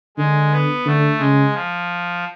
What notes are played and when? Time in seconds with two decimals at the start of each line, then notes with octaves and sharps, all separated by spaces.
0.17 D3 G#3
0.51 B3
0.85 D3 A3
1.19 C#3 G#3
1.53 F3